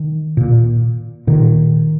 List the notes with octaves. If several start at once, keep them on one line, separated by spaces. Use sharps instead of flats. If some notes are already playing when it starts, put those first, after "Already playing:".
Already playing: D#3
A#2
A#2 D#3